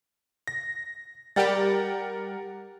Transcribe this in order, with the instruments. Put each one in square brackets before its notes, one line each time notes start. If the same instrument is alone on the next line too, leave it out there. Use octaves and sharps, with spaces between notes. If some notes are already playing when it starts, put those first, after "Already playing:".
[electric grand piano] A#6
[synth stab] G3 G4 [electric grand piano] A#4 F#5 A6